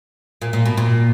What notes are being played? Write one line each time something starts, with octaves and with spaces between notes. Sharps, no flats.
A#2
A#2
B2
A#2